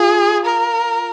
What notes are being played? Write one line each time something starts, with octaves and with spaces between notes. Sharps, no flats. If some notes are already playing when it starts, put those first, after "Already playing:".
Already playing: F4 G#4
A#4